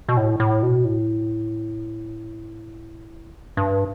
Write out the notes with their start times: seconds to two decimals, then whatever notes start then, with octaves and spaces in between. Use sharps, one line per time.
0.09 B2
0.17 A2
0.40 A2
0.63 B2
0.84 A2
3.57 G2